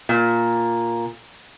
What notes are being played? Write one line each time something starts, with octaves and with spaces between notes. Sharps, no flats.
A#2